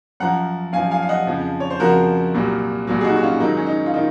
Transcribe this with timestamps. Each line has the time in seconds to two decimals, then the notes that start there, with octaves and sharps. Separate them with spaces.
0.20 F#2 F3 F#5 A#5
0.73 F#2 F3 F5 G#5
0.91 F5 G#5
1.02 F5
1.09 D#5 F#5
1.27 F2 C#3 F3
1.60 C#5
1.70 C5
1.80 F2 C#3 F3 F#4 A#4
2.34 C2 A#2 F#3
2.87 C2 A#2 F#3
3.01 G#4
3.04 D#4 F#4
3.16 F#4
3.22 C#4 F4
3.40 G#2 D#3 F#3 D#4
3.57 C#4
3.66 D#4
3.86 F4
3.94 D#3 D#4